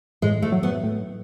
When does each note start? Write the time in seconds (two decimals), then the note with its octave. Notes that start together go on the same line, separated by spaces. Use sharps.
0.22 A2 G#3
0.42 A3
0.52 F#3
0.63 B3
0.83 A2